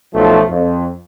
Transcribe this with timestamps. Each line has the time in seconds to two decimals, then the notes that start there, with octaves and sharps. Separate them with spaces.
0.15 B1 F3 A3
0.50 F2